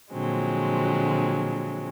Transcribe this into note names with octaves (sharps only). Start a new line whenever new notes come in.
A#2 D3 F3 F#3 G#3 C4